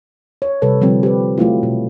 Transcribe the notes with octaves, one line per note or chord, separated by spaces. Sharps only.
C#5
C3 G3 A4 B4 C#5
D3 F3 G3 C4
G4 B4
F#3 A3 E4 F4
B2